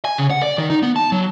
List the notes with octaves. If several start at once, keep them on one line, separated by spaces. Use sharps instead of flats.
G#5
C#3
F#5
D5
D#3
D#4
B3
A5
F#3